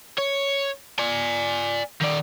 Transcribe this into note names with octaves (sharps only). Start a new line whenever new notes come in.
C#5
D5 G#5
D#3 D5